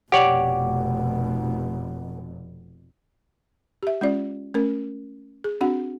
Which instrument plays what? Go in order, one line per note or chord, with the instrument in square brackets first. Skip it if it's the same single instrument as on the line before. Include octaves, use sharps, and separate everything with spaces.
[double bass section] F1 [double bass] B2 [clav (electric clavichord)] G4 C#5 D5 [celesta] F#5
[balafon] G4 E5
G#3 C#4 F4 D5
A3 C#4 A#4
G#4
C4 D4 F#4 F#5